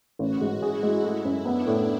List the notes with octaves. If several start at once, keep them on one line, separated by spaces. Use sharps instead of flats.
A1 F#4
G#2
E4 G#4
G#3
A3
F#2
B3 D4
A2